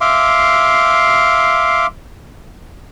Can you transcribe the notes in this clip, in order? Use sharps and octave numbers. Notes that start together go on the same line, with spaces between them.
E5 F5 C6 D6